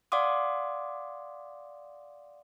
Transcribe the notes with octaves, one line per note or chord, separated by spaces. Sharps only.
D5 F5 F#5 C6 D6 D#6